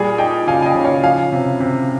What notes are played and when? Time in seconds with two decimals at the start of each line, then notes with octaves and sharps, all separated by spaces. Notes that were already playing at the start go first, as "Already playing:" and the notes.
Already playing: A#2 G3 G#4
0.18 D#4 D#5 G5
0.47 C#3 F5 G#5
0.62 G#5
0.66 D#5 G5
0.75 C#3
0.84 C#5 F5
1.03 F3 F5 G#5
1.32 C3
1.60 C3